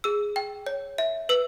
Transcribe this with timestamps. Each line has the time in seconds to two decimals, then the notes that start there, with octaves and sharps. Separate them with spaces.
0.04 G#4 E6
0.36 G5
0.66 C#5
0.98 E5
1.29 B4 E6